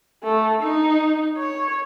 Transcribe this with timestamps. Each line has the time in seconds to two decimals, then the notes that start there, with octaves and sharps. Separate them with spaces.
0.23 A3
0.63 D#4
1.38 C#5